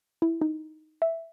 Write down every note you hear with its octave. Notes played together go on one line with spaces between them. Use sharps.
E4
D#4
E5